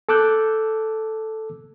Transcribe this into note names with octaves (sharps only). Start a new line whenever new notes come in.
A4 A5 D6 E6 F#6 G6